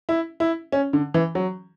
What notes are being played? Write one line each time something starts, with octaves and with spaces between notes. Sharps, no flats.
E4
E4
C#4
D3
E3
F#3